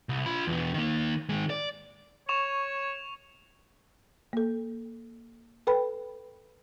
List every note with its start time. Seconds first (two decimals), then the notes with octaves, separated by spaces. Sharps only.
0.09 C2
0.26 F4 B5
0.47 E2 B2
0.74 D#3 A#3
1.29 D#3 G#3
1.50 D5
2.29 C#5 C#6 E7 F7
4.33 A#3 A4
5.67 A4 B4 G5 B5